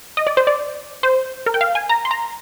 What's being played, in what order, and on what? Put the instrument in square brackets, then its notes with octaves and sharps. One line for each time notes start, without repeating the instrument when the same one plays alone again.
[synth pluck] D#5
D5
C5
D5
C5
A#4
G5
F5
G#5
A#5
C6
A#5